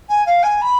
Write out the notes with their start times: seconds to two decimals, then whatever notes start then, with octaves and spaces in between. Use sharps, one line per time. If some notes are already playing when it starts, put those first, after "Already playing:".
0.09 G#5
0.26 F5
0.43 G#5
0.62 B5